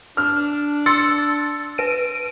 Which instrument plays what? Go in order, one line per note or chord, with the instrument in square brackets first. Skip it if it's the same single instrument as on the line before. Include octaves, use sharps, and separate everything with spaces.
[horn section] D4 [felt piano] F6
[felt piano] C6 [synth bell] E6 A6 C#7
[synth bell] B4 D7 D#7